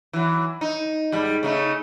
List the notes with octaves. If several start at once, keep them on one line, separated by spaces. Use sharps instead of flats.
E3 F#3
D#4
G#2 G3
C#3 A3 D#4